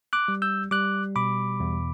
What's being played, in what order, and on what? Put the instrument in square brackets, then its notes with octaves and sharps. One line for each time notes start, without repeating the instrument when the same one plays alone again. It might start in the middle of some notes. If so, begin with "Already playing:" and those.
[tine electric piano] D6 F#6
G3
E6 G6
G3 D6 F#6
B2 B5 D6
E2